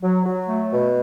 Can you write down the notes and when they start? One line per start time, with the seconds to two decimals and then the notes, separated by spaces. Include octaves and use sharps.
0.02 F#3
0.24 F#3
0.49 A3
0.73 B2